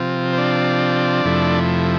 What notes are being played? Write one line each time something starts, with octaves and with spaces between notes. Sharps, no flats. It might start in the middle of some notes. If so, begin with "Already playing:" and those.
Already playing: C3 F3 C4 F4
C5
D4 D5
F2 C3 F3 A3 E4